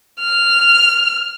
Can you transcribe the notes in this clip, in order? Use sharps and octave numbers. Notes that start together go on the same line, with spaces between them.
F6